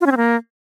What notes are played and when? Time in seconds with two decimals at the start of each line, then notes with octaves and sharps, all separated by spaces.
0.01 F4
0.06 C#4
0.12 C4
0.17 A#3